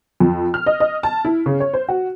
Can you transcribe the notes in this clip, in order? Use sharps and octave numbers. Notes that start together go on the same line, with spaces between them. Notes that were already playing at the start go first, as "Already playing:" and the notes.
F2
F6
D#5
D#5
A5
E4
C#3
C#5
C5
F#4